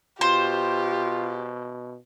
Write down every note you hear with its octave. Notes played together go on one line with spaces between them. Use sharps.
B2 F4 G4 C5